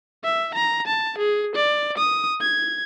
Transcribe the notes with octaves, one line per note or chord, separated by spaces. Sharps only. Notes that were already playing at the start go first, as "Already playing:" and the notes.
E5
A#5
A5
G#4
D5
D#6
G#6